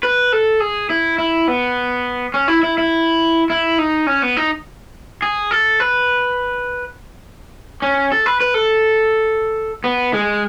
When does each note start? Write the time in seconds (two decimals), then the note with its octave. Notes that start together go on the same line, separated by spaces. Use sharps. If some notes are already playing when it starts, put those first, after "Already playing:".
0.03 B4
0.32 A4
0.60 G#4
0.90 E4
1.18 E4
1.48 B3
2.34 C#4
2.48 E4
2.63 E4
2.78 E4
3.50 E4
3.78 D#4
4.07 C#4
4.22 B3
4.37 D#4
5.22 G#4
5.51 A4
5.80 B4
7.82 C#4
8.12 A4
8.26 B4
8.40 B4
8.54 A4
9.84 B3
10.14 G#3